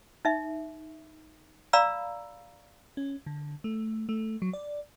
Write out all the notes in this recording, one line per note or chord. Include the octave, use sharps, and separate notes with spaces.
D#4 E5
D5 F5 A#5 B5 E6
C#4
D3
A3
A3
F#3
D5